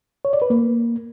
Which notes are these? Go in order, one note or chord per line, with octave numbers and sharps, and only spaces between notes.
C#5
D5
B4
A#3